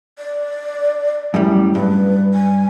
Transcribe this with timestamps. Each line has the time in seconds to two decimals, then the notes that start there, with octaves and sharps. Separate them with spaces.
0.19 D5
1.34 F#2 A2 G3
1.75 G2 B4
2.34 G#5